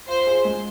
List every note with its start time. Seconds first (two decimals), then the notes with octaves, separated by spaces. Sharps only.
0.08 F4 C5
0.27 G#4
0.45 G#3